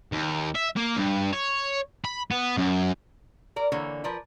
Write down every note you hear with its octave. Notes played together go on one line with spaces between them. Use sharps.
D#2
E5
A#3
G2
C#5
B5
B3
F#2
A#4 D5
D3 E3 A#3 C#5
F3 A#4 B4 D5